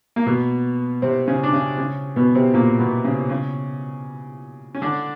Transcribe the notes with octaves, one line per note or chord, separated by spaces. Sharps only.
A#3
B2 B3
C3 C4
C#3 C#4
D4
C#3 C#4
C#3 C#4
B2 B3
C3 C4
A#2 A#3
B2 B3
C#3 C#4
C#3 C#4
C#4
D3 D4